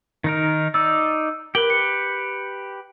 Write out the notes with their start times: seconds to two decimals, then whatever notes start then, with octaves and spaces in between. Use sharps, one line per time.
0.24 D#3 D#4 A#4
0.74 D#4 D5 E6
1.55 G4 A#4 B4 F#7 G7
1.70 C#7